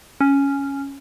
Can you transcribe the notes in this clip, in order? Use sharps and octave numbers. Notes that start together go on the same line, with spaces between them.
C#4